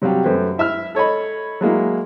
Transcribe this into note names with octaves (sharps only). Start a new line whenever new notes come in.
C3 F#3 G3 F5 G5
F#2 A3 B4 C5
E4 E5 E6 F6
A4 C#5 D#5 B5
F#3 G#3 A#3 E4